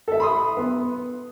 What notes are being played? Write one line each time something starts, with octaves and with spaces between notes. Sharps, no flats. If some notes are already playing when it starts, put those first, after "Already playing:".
A4 E5
B5 C6 D#6
B3